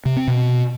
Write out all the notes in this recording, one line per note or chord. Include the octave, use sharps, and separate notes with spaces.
C3
C4
B2